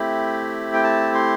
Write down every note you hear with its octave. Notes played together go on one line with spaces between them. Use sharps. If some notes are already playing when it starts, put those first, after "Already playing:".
Already playing: A3 C4 E4 G4 B5
G5
A5
C6